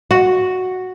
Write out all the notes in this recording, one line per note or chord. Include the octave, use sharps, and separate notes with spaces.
F#4